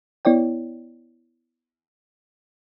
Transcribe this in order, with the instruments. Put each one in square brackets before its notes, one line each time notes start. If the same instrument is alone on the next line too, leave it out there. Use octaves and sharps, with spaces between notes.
[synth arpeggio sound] B3 E4 C#5 D5 G5